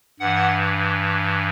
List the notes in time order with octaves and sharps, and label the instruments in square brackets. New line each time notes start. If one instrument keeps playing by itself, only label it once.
[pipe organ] G2 E3 F#5